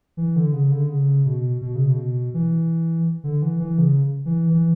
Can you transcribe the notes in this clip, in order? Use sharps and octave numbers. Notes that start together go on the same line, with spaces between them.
E3
D3
C#3
D3
C#3
B2
B2
C#3
B2
E3
D3
E3
E3
C#3
E3
E3